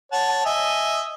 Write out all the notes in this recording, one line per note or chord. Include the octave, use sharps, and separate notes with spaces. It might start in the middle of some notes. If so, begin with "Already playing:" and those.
C#5 F#5 A5
D#5 E5 G#5